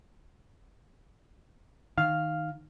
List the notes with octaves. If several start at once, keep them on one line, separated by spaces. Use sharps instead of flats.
D#3 F5 F6